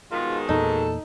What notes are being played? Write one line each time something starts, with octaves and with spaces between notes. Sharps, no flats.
G#2 B2 D#3 F4
E2 A#2 A#3 D#4 A4